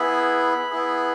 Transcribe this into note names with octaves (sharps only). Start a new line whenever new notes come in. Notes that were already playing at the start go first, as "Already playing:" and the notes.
Already playing: B3 E4 G#4 B5
B3 E4 G#4